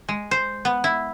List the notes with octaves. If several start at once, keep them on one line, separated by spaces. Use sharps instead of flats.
G#3
C5
B3
E4